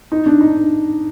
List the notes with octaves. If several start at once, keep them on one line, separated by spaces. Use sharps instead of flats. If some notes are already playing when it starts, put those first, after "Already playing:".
D#4
D4
D#4